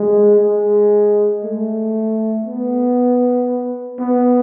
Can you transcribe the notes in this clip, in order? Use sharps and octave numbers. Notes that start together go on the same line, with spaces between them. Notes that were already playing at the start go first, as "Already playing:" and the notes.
Already playing: G#3
G#3
A3
B3
B3